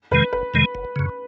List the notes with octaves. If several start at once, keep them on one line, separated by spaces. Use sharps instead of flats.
F2 C3 D#3 G#3 B4
F#1 B4
F2 C3 D#3 G#3
F#1
F#2 C#3